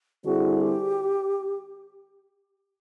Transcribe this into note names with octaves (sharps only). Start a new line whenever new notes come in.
D3 G3 C4 E4 F#4 G#4
G4